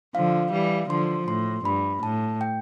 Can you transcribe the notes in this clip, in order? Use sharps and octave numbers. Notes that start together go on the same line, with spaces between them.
D3 F3 F5
E3 G3
D3 F3 C6
A2 C6
G2 B5
A2 A5
G5